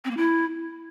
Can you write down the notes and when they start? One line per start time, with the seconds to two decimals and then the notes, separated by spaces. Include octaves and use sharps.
0.05 C4
0.11 A#3
0.17 E4